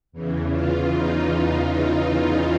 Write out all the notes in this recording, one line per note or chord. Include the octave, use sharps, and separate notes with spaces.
E2 C#3 E3
F4
D#4